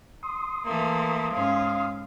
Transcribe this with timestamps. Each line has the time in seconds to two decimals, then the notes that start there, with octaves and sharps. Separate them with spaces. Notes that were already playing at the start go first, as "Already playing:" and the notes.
0.23 C6 D#6
0.65 E3 A3 A#3
1.34 G#2 C#4 F5